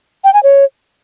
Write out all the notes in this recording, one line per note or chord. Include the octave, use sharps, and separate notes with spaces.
G5
G#5
C#5